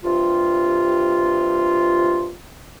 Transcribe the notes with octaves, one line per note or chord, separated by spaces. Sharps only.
G2 C3 F4